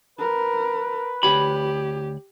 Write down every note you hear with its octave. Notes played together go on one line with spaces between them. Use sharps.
A#4 B4
D2 G4 C#5 B5